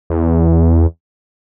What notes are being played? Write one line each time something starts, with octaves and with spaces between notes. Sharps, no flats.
E2